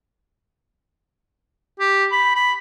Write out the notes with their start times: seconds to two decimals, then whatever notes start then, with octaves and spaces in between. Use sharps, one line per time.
1.80 G4
2.12 B5
2.35 B5